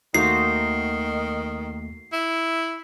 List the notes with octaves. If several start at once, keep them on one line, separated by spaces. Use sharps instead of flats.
D#2 D#3 A3 A#3 D#4 F#4 C5 C7
E4